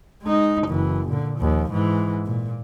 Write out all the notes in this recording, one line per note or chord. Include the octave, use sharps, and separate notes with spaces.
G#3 D#4
F#1 E3
A#2 D3
D#2 F3
G#2 E3
A#2